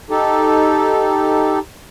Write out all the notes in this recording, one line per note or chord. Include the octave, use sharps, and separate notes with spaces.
D#4 G4 A4